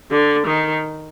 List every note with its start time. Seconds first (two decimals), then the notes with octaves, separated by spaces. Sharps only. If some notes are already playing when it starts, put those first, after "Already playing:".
0.11 D3
0.46 D#3